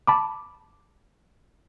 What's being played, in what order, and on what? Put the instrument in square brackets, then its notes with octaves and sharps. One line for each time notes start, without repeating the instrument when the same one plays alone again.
[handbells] A5 B5 D6